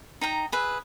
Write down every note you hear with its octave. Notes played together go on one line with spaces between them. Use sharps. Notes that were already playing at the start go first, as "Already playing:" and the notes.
D#4 G5 A#5
G#4 B4 E5